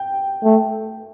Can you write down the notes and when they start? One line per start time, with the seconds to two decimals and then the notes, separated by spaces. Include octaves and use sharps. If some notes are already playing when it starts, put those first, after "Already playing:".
Already playing: G5
0.44 A3